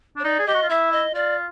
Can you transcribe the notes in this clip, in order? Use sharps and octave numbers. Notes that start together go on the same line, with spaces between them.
D4
C#5
D#4 D5
G#4
G4 D#5
F#4
F4
E4 E5
D#5
F4 D5